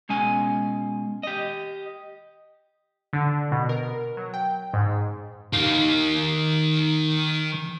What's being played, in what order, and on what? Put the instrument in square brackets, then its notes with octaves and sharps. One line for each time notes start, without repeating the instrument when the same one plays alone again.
[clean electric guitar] B2 G#3 C#4 G#5
G4 D#5
[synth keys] D3
B2
A#4
F#3
G5
G#2
[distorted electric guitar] D#3 F5